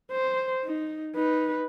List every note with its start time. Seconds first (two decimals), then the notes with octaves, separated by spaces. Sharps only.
0.11 C5
0.65 D#4
1.15 D#4 B4